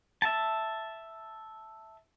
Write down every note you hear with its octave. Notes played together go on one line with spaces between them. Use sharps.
E5 A5